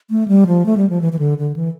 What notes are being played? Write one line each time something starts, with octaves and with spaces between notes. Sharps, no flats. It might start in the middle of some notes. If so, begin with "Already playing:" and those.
A3
G3
F3
A3
G3
F3
E3
E3
D3
D3
E3